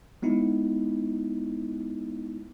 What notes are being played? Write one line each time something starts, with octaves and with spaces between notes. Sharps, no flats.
G#3 B3 D#4 E4